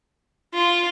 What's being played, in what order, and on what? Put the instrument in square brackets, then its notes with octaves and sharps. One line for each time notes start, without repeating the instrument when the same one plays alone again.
[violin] F4